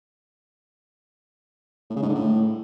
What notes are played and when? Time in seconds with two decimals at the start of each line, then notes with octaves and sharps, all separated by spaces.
1.90 A2
1.96 C#3
2.02 G#2
2.09 D3
2.15 A2